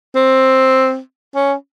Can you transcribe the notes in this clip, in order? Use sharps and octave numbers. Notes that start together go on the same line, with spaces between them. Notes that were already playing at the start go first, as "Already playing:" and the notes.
C4
C#4